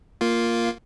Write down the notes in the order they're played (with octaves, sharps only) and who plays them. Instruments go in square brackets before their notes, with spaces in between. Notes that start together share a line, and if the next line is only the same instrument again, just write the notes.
[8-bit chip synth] A#3 F4